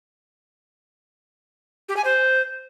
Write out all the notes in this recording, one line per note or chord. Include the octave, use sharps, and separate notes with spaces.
G4
G#5
C5